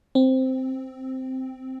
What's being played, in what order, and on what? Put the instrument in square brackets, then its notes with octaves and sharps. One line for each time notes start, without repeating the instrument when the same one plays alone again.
[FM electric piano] C4